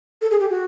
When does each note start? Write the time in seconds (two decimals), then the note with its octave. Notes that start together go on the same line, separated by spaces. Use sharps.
0.22 A4
0.31 G#4
0.40 G4
0.50 F#4